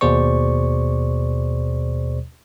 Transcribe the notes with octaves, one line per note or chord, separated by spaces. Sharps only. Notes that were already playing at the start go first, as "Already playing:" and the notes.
D#2 B2 G#4 C5 D5 C#6